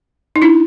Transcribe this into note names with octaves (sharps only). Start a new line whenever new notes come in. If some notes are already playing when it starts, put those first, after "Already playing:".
D#4
D4 E4